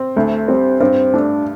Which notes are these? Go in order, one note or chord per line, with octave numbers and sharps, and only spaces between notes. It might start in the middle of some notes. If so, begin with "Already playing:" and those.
Already playing: C4
D2 A3
G3 C4
G2 C4
A3 D4